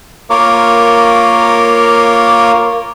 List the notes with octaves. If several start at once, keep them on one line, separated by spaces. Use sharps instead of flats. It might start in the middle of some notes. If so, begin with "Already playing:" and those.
A#3 F4 A#4 C#5 D6